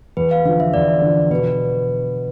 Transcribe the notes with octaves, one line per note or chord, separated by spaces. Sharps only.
E2 B4
F5
D3 F3 F5
E5
E2 D5
D3 F3
B2 B4